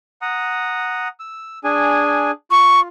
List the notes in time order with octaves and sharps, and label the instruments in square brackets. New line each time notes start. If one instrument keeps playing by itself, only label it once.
[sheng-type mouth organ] F#5 A#5 D#6
E6
D4 G#4 G#5
[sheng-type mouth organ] F4 [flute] C#6